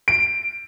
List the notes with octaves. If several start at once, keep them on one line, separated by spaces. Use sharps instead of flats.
D7